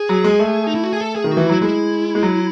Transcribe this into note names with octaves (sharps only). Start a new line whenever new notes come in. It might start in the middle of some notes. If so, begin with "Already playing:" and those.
Already playing: G#4
F#3
G#3
A3
D#4
E4
F#4
G#4
A4
G#4
D#3
F#4
E3
F#3 E4
G#3 E4
G#3
F#3